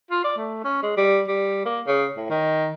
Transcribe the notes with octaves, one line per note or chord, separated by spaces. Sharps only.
F4
D5
A3
C#4
G#3
G3
G3
A#3
C#3
A2
D#3